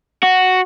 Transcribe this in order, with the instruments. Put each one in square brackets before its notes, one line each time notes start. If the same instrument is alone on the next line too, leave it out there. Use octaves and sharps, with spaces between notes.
[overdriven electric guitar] F#4